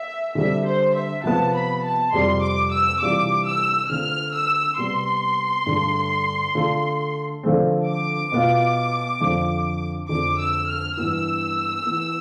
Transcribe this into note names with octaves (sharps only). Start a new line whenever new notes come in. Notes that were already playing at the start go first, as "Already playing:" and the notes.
Already playing: E5
D3 G3 C4 E5
C5
E5
C3 F3 B3 A5
B5
A5
F2 C3 G3 C6
D6
E6
C3 E3 G3 D4 F4 D6
E6
D3 A3 C4 F4 F6
E6
C3 G3 B3 C6
G2 D3 A3
D3 A3 D4 F4
D3 F3 A3 C4
D6
B2 B3 F4
F2 D3 F3
F2 D3 A3 D6
E6
F6
G2 E3 B3 E4 E6
E3 B3 E4